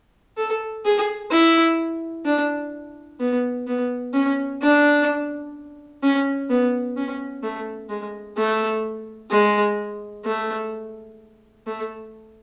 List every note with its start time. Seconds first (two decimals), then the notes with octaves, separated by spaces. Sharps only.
0.37 A4
0.86 G#4
1.31 E4
2.26 D4
3.20 B3
3.67 B3
4.14 C#4
4.62 D4
6.03 C#4
6.50 B3
6.97 C#4
7.43 A3
7.90 G#3
8.37 A3
9.31 G#3
10.25 A3
11.67 A3